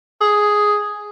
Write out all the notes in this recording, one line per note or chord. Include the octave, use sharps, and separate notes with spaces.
G#4